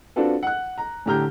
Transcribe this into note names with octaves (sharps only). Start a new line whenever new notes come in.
C4 D4 F4 F#4 A4 B4
F#5 F#6
A#5
A2 D3 G4 A#5 F6 G6